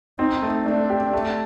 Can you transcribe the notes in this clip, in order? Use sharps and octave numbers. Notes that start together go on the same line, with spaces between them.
C4 D#4
A3
A3 D4
G4
A3